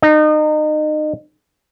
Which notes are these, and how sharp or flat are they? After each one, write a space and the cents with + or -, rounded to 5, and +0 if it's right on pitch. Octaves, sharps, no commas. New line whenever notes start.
D#4 -30